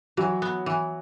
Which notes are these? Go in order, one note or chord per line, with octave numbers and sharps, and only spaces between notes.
E3 F#3
B3
E3